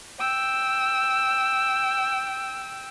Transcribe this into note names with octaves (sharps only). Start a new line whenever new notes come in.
G5 E6